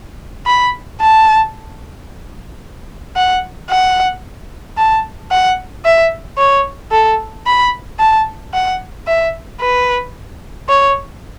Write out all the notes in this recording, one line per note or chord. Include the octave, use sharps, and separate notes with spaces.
B5
A5
F#5
F#5
A5
F#5
E5
C#5
A4
B5
A5
F#5
E5
B4
C#5